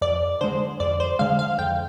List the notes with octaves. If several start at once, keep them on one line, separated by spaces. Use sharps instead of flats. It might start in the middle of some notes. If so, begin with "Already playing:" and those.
F2 D5
D3 G#3 C5
F2 D5
C5
D3 G#3 F5
F5
F2 G5